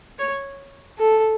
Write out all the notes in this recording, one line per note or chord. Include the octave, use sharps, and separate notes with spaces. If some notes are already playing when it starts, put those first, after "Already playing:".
C#5
A4